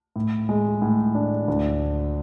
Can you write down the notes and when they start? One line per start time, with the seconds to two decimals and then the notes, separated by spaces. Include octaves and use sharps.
0.16 A2
0.49 G#3
0.82 A2
1.15 D4
1.48 D2